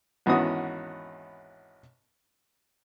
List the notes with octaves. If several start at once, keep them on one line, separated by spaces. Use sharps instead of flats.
G#1 E2 B3 C#4 F#4 D#6